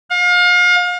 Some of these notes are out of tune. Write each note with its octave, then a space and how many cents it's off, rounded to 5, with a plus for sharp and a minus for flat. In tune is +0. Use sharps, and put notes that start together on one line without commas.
F5 +35